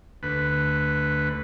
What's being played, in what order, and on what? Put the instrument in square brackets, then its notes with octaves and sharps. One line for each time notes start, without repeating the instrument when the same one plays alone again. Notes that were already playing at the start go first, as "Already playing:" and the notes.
[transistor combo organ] D2 B4